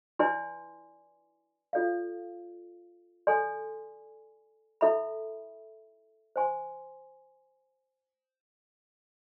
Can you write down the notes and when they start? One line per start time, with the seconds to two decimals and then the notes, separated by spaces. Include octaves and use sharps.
0.19 E4 B4 D5 G#5 C6
1.73 F4 A4 D5 F5
3.27 A4 D5 G#5 C6
4.81 E4 A4 E5 B5
6.36 C5 G#5 C6